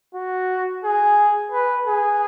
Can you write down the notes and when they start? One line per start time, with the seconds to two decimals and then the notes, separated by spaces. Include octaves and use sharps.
0.15 F#4
0.84 G#4
1.52 B4
1.87 G#4